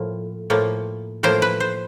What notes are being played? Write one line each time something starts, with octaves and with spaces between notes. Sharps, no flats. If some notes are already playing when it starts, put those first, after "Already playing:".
Already playing: A2 F3 A#3
A2 F3 A#3
A2 F3 A#3 C5
B4
C5